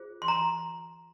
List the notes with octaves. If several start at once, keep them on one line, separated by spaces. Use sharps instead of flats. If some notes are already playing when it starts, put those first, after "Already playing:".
Already playing: F4 G#4 C5
C6
A#5